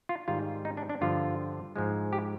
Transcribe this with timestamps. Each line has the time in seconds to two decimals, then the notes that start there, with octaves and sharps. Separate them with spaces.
0.09 F4
0.28 G#2 D#3 G3 F4
0.65 D#4
0.77 D4
0.89 D4
1.01 G2 D3 F3 F4
1.76 G#2 F3 G#3
2.13 G4